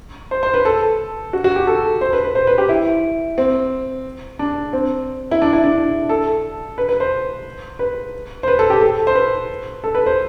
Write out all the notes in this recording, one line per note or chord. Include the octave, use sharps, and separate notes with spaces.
C5
C5
B4
A4
F#4
F#4
G4
A4
C5
B4
B4
C5
B4
G4
E4
C4
D4
C4
E4
D4
E4
D4
A4
B4
B4
C5
B4
C5
B4
A4
G4
A4
C5
B4
A4
B4
C5